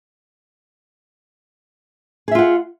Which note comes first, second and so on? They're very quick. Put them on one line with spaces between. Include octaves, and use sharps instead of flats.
G#4 E5 F4 F#5